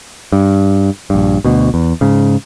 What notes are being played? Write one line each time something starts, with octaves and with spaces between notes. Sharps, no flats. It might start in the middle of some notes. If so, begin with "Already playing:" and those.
G2
A#1 G2
D2 B2
E2
G#2 C#3